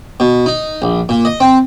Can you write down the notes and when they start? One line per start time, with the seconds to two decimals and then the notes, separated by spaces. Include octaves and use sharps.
0.20 B2
0.46 D#4
0.82 A#1
1.09 A#2
1.25 D#5
1.40 C4